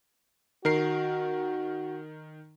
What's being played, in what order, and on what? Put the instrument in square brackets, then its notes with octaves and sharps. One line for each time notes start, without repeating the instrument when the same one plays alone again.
[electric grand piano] D#3 A#4 C7 [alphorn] F#4